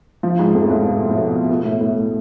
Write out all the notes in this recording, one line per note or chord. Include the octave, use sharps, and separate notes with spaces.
F3
G#2
F2
A2
G#2
B2
A2
B2
B2
A2
A2
A2